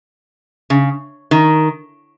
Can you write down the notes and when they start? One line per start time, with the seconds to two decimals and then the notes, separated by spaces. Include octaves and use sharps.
0.70 C#3
1.31 D#3